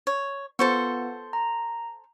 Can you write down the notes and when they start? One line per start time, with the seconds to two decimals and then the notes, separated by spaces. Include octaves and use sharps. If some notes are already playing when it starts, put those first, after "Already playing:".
0.07 C#5
0.59 B3 F4 A4 C5 C#6
1.33 A#5